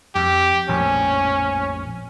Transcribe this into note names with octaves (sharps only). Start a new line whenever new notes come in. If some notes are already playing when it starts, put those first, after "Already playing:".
F2 G4
A#1 F2 A2 C#4